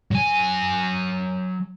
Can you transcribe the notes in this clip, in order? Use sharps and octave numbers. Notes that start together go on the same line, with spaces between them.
F#3 G#5